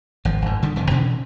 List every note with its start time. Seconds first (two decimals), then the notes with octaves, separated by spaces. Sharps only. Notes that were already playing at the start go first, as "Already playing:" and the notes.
0.25 G#1 F3
0.42 G1 G#2
0.62 D3 D#3 G3
0.76 F1 F2 D#3
0.90 B2 D3 E3 C#4